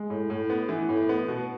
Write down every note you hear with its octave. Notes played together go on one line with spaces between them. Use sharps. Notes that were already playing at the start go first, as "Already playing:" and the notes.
Already playing: G#3
A2
A2
B3
E3
A2
B3
B2